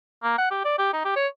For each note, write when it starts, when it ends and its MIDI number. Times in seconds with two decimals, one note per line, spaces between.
0.23 0.37 58
0.38 0.49 78
0.51 0.62 67
0.65 0.79 74
0.79 0.90 67
0.93 1.00 63
1.05 1.15 67
1.16 1.27 73